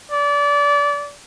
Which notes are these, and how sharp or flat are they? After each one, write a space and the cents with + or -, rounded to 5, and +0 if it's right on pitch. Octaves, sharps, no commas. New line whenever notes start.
D5 -25